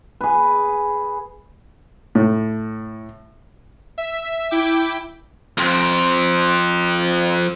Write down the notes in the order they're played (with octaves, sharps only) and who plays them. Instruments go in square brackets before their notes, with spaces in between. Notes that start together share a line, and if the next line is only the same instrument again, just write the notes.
[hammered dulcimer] G#4 B4
[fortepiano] A2
[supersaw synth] E5
E4 G5 D6
[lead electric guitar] F2 C4